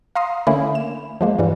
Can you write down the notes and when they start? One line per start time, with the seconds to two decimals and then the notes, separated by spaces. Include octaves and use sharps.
0.15 F5 A#5 C6 D#6
0.47 D3 A3 A#3 C#4 E4
0.75 E7
1.21 F3 G#3 A#3
1.38 G2 E3 G3